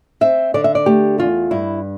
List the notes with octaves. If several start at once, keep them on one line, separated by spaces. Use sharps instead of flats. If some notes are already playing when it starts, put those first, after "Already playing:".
C4 E5
D3 D5
E5
D5
A3 G4
E2 F4
G2 E4